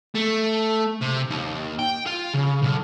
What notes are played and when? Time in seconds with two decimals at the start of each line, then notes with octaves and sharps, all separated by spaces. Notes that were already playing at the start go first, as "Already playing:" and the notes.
0.15 A3
1.01 C3
1.30 D#2
1.79 G5
2.06 F4
2.34 C#3
2.63 B1